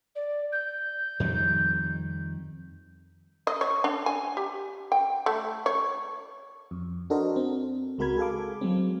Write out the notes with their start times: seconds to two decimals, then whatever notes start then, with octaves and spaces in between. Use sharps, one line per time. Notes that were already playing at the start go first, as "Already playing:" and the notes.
0.15 D5
0.52 G6
1.20 F2 D#3 G3
3.47 D#5
3.61 C#5
3.84 D4
4.06 G#5
4.37 G4
4.92 G5
5.26 A3
5.66 C#5
6.71 F2
7.10 D4 F#4 A4 A#4 C5 D#5
7.36 C4
7.98 C#2 G#3 F#4 A#4 B5 G#6
8.18 G#4 A4 F5 D6
8.61 F#3 G#3 C4